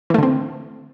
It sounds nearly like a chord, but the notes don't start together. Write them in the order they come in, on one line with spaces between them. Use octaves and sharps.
E3 A3 D3 C4